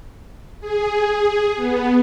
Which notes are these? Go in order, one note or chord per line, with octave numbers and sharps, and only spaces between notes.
G#4
B3